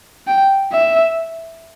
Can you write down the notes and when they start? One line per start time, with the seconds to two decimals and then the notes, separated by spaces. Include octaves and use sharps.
0.27 G5
0.72 E5